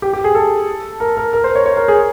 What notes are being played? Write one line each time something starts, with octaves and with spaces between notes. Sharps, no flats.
G4
G4
G#4
A4
A#4
A#4
A#4
C5
C#5
C#5
A#4
G#4